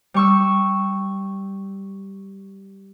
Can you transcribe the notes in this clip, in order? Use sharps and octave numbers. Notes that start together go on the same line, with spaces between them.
G3 C#6 E6